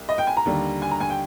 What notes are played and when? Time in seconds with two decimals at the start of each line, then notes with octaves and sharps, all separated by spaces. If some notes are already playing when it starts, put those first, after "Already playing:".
Already playing: C2
0.09 D#5
0.18 G5
0.27 G#5
0.37 A#5
0.45 D#2 D3 G3
0.82 G#5
0.91 A#5
1.00 G#5
1.10 G5